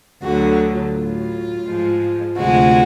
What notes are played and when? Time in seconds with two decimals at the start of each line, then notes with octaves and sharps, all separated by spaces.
0.22 D2 D3 F#3 F#4
0.93 A2 F#3 F4
1.65 G#2 F3 G#3
2.37 D2 C3 F3 G#3 F#4